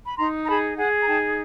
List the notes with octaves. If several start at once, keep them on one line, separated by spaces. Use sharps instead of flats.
B5
D#4 A#5 C6
A#5
G#4 A5 B5
G#4 F#5 G#5
A#5
D#4 G5 A5